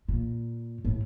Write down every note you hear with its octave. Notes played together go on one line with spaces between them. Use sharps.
A#2
A2